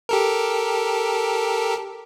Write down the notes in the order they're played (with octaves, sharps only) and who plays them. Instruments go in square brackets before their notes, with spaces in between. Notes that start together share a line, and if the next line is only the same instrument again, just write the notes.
[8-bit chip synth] G4 A4 A#4